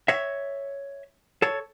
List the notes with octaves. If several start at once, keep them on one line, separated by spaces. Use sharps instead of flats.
C#5 E5
A4 C#5